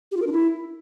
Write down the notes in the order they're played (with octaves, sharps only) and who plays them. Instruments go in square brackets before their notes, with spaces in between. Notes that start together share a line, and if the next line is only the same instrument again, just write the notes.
[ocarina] G4
F4
A#4
D4
E4